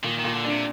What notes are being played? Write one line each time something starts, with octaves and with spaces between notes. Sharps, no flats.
A#2 D#3
D#3
A#2
D3
D4
C3